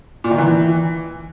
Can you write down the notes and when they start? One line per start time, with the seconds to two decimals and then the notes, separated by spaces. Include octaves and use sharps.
0.24 A#2
0.31 D#3
0.38 E3